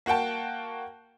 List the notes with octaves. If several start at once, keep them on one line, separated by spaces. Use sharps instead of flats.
A#3 F#4 F#5 G5 A5